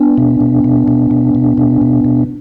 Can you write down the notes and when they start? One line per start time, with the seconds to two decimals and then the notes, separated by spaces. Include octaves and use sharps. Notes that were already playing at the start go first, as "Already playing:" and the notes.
Already playing: B3 D4
0.18 B2
0.41 B2
0.64 B2
0.88 B2
1.11 B2
1.35 B2
1.58 B2
1.81 B2
2.04 B2